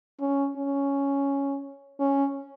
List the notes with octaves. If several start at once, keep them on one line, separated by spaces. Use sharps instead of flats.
C#4
C#4
C#4